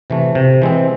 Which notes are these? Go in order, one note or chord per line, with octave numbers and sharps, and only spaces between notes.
C3 E3 A3
C3
E3 G#3 C4